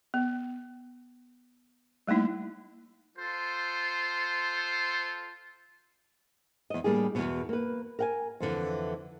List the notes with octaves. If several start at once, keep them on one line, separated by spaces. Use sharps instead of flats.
B3
G3 A3 A#3 D#4 E4
F4 A4 C5
E2 D#5
A2 G3 A#3 D4 G#4
E2 G#2 B2
A#3 B4
A#4 F#5 G#5
F2 D3 E3